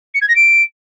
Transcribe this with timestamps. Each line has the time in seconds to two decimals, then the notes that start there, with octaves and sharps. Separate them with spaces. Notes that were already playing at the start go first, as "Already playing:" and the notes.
0.14 C#7
0.21 G#6
0.29 A#6
0.36 D7